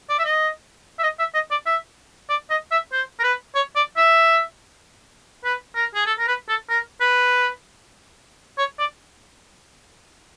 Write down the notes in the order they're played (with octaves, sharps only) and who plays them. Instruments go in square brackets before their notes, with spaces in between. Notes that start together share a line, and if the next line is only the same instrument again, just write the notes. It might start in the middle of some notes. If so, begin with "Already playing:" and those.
[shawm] D5
E5
D#5
E5
D#5
E5
D#5
D5
E5
D5
D#5
E5
C5
A#4
B4
C#5
D5
E5
B4
A#4
G#4
A4
A#4
B4
A4
A#4
B4
C#5
D5